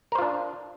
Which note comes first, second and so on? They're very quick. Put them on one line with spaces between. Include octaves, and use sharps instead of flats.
A#4 C5 F4 D4